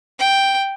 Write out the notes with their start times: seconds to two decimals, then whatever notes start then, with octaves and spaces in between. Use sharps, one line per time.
0.19 G5